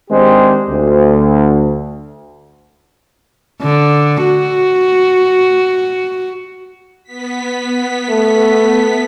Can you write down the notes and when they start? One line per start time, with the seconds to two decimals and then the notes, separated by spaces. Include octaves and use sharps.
0.10 D#3 G#3 C4 D4 G4 C5
0.69 D2
3.62 D3
4.24 F#4
7.04 B3 B6
8.10 A3